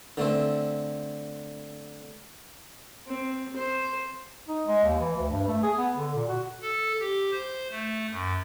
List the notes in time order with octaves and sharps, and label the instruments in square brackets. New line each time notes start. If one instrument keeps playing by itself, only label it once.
[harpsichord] D3 A3 C4
[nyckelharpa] C4
C5
[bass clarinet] D#4
G#3
D#2
E3
D2
G2
A3
G#4
B3
D3
A#2
F#4
[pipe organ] A4
G4
C5
A3
F#2